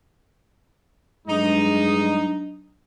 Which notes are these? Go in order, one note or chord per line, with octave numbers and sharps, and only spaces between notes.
G2 F#3 G#3 D4 D#4 D#6